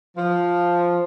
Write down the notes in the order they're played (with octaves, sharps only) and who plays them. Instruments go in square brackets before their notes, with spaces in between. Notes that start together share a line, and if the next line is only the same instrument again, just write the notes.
[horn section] F3